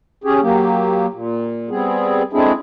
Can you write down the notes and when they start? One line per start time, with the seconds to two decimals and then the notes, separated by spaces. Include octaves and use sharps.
0.24 C#4 G4 G#4
0.42 F#3 A#3 G4
1.13 A#2
1.70 G3 B3 C4 G#4
2.33 G#3 A3 C4 D4 E4 G#4